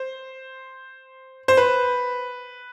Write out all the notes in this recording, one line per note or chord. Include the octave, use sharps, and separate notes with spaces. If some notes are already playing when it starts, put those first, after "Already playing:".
Already playing: C5
C5
B4